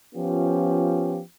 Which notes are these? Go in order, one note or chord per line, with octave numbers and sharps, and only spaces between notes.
F3 B3 C#4 F4 G4